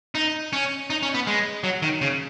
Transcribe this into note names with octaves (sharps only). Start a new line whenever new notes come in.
D#4
C#4
D#4
C#4
B3
G#3
F#3
D#3
C#3